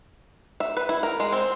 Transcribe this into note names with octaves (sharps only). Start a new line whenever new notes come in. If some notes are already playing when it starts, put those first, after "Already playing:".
E5
B4
E4
A#4
G#3
C4